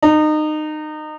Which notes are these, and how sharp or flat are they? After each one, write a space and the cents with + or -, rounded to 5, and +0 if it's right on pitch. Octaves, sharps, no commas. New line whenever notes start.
D#4 -25